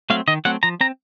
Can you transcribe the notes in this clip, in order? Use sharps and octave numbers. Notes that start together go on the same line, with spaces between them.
F#3 A3 C4 F5
D#3 D#5
F#3 A3 C4 F#5
F3 A#5
C4 A#5